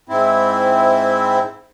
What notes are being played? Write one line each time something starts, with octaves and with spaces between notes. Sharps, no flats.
G#2 C4 E4